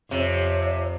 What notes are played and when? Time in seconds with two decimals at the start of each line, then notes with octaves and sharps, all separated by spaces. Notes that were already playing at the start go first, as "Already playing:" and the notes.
0.11 F2 C3 C#5